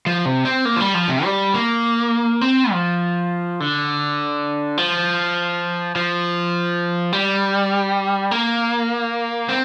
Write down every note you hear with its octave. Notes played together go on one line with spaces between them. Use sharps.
F3
C3
C4
A#3
F3
G3
F3
C3
G3
A#3
C4
F3
D3
F3
F3
G3
A#3
C4